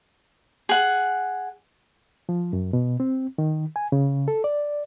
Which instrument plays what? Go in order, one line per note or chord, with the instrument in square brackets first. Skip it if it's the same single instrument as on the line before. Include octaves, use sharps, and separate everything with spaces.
[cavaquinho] G#4 F#5
[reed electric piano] F3
F#2
B2
C4
D#3
G#5
C#3
A4
D5